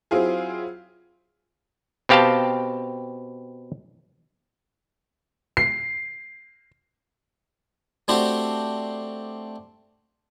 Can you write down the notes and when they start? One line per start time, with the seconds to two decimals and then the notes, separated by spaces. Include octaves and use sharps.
0.11 F#3 C4 E4 F4 G#4
2.09 B2 C4 G4 F5 G5 A5
5.57 C7
8.08 A3 C4 D4 F#4 G4 C5